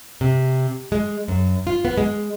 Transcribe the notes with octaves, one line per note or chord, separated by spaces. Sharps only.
C3
G#3
F#2
F4
B3
G#3